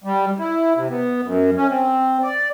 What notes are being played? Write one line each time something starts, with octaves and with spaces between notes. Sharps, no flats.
G3
E4
C3
B3
F#2
C#4
C4
D5